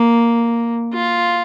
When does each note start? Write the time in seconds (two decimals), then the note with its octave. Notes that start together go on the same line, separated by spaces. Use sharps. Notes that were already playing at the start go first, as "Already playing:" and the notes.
Already playing: A#3
0.93 F4